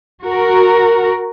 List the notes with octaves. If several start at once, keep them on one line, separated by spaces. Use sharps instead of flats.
F#4 A#4